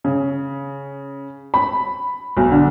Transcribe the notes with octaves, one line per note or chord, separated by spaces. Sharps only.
C#3
B5
B1
D3